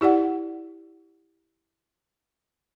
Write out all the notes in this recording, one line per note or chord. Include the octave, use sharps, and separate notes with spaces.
E4 G4 D5 F#5